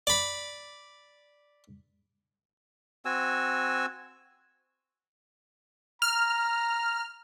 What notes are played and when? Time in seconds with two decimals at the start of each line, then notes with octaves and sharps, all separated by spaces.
0.07 D5 B5
3.05 C4 F#4 G#5 E6
6.02 A#5 F6